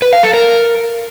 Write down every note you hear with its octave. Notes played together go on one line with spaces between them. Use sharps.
B4
F5
A4
A#4